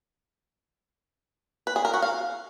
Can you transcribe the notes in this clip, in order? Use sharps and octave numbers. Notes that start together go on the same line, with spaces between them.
B4
G#4
A#4
F#4
F5